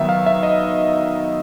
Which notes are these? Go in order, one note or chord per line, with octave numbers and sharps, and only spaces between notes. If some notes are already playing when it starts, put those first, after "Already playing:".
Already playing: D#3 F#3 B3 E5
F5
E5
D#5